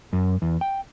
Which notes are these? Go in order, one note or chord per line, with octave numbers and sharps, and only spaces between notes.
F#2
E2
G5